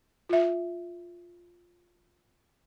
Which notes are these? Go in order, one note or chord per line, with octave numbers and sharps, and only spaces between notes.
F4 E5